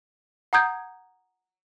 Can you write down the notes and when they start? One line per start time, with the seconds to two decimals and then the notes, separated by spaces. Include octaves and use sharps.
0.53 F#5 A#5 D#6 G6 G#6